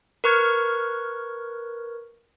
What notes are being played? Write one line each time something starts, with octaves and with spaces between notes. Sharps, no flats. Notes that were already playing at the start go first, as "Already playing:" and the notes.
A#4 B4 C#6 F6 G#6